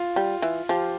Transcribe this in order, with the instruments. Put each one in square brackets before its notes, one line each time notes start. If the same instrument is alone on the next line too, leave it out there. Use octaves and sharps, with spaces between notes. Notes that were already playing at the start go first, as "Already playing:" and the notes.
Already playing: [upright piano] F4
[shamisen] G3
E3
[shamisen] F3 [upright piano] G4